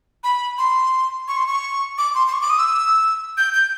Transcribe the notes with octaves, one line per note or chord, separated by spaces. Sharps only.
B5
C6
C#6
C6
C#6
D6
C6
C6
C#6
D6
D#6
E6
G6
G6